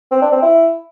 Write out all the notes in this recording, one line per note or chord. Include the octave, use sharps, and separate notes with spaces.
C4
D4
C4
E4